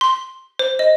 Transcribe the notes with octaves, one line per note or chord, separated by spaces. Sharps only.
C6
C5
D#5